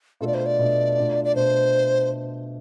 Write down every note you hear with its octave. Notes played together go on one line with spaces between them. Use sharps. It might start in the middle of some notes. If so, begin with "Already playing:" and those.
B2 A3 D4 F4 A4
D5
C5
D5
B2 A3 D4 F4
B2 A3 D4 F4
D5
B2 A3 D4 F4 C5